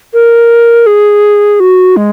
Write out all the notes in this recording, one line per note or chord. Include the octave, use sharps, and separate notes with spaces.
A#4
G#4
F#4
G#3